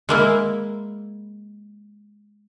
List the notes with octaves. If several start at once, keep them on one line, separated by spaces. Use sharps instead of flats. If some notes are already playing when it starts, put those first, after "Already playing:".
G#3 A#3 E4